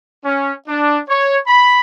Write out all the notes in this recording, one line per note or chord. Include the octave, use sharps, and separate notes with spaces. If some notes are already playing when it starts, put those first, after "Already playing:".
C#4
D4
C#5
B5